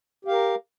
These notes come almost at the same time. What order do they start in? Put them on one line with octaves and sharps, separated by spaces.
G4 F5 A#4